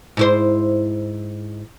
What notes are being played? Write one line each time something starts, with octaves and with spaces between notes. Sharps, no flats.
G#2 E4 C5